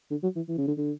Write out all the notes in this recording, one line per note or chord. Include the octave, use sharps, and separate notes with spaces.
D3
F#3
E3
E3
C#3
D3
D3